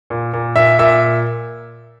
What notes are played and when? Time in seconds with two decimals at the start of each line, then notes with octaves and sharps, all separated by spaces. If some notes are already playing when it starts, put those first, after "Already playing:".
0.10 A#2
0.33 A#2
0.56 A#2 E5
0.79 A#2 E5